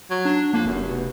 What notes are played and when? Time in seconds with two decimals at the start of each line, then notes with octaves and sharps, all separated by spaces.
0.10 F#3
0.25 D4
0.54 F2 A#3
0.65 F1 F#2
0.88 B2